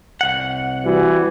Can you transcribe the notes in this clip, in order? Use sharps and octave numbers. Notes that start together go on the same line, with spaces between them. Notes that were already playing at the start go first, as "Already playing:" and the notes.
C2 F#5
E3 G3 F#4